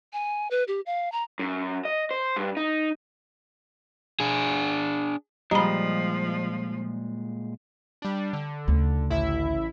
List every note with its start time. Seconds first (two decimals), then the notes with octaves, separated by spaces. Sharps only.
0.13 G#5
0.51 B4
0.68 G4
0.86 F5
1.12 A#5
1.39 F#2
1.85 D#5
2.11 C5
2.36 G2
2.57 D#4
4.20 D4 G#4
5.51 A#2 F3 G3 G#3 G4 D#5 A#5 B5
8.02 G3 D4
8.33 D3
8.68 D2 C#3
9.09 A1 E4 E5